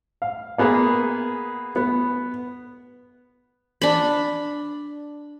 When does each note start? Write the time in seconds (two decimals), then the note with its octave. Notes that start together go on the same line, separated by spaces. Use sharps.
0.22 F5
0.58 A#3 B3 G#4
1.76 B3
3.82 D4 B5